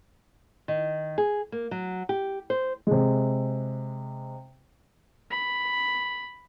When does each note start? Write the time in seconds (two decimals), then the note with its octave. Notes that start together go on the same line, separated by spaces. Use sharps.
0.68 D#3
1.18 G#4
1.52 A#3
1.71 F#3
2.09 G4
2.50 C5
2.87 C3 G#3
5.30 B5